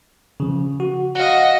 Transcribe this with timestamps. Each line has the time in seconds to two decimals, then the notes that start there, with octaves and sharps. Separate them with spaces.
0.40 C#3 F3
0.80 F#4
1.15 F#4 D#5 F5 F#5